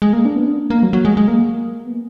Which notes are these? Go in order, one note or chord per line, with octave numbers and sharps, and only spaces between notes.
G#3
A#3
D4
B3
D4
A#3
A#3
F#3
F#3
G#3
G#3
A#3
B3